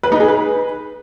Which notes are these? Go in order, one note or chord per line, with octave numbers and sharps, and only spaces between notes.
B4
D#4
G#4
B4